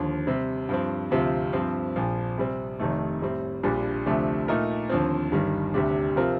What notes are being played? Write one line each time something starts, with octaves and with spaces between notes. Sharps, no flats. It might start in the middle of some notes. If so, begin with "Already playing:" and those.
Already playing: D#2 D3 F3
C3 G3 C4
G2 F3 C4
D2 C3 F3 C4 F4
G2 F3 C4
A#1 A#2 F3
C3 G3 C4
F1 F2 C3 D#3 A3
A2 G3 C4
A#1 A#2 G3 D4
D2 C3 F3 A3 D4
A#2 A3 D#4 A#4
D#2 D3 F3 C4
G1 G2 D#3 G3
D2 C3 G3 D4 G4
C3 F3 C4 F4 A#4